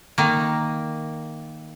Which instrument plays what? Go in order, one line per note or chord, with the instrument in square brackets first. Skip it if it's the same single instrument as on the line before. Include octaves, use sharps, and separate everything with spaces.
[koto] D#3 A#3